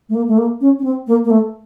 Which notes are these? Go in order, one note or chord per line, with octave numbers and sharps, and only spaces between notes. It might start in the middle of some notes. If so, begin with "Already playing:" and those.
A3
A#3
A3
A#3
C#4
C#4
C4
A#3
A#3
A3